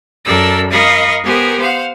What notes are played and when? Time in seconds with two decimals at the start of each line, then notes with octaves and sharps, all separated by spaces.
0.24 F#2 A4 A#4 D5 E6
0.71 A#4 D#5 F5 B5 C#6 D#6
1.24 B3 G4 G#4 A#4 C5
1.59 C5 F5 F#5